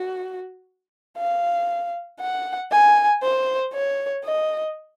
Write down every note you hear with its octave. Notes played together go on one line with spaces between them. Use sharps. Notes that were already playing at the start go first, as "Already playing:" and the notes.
Already playing: F#4
F5
F#5
G#5
C5
C#5
D#5